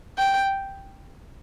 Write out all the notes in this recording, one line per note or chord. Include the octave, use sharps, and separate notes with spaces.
G5